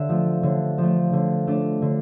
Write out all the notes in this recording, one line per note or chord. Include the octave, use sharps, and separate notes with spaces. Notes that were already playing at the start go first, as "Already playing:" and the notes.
Already playing: D3 E5
F3 A3
D3
F3 A3
D3
A3 D4
D3